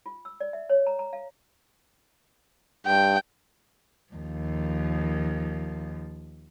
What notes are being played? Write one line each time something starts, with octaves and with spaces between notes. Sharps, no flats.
F4
E6
D5
E5
C#5
A#5
A#5
F5
G2 G5
D#2 F3